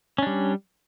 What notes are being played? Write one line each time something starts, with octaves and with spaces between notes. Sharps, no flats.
G3 C#4 D4